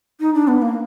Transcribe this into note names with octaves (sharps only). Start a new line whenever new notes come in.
D#4
D4
B3
A#3